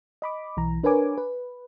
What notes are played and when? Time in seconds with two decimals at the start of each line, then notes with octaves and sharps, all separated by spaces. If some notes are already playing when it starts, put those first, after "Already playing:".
0.22 D#5 B5 D6
0.57 B1 E3 A#5
0.83 D4 A#4 B4 C#5 G#5 D6
1.18 B4